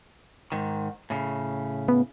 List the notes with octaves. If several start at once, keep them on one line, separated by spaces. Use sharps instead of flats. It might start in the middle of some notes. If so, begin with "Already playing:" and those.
G#2 D#3
A2 C#3
B3